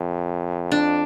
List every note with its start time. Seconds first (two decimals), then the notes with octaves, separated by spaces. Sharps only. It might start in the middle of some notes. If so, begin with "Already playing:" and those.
Already playing: F2
0.72 D4